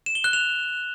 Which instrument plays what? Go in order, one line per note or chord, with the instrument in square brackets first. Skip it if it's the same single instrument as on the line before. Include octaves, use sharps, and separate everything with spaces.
[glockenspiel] E7
G7
F#6
F7